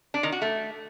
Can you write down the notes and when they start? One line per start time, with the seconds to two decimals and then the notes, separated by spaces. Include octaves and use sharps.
0.14 D4
0.23 D#3
0.32 F#4
0.42 A3